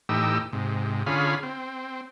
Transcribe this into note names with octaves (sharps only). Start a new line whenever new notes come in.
A2 E3 D#4 G4 E6
G#2 C3
D3 C#4 F4 G#4 F5 B5
C4